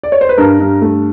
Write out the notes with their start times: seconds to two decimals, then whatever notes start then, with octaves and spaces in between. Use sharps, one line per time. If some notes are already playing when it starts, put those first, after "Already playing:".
0.03 D5
0.12 C#5
0.21 C5
0.29 B4
0.38 G2 A#4
0.60 G2
0.82 A3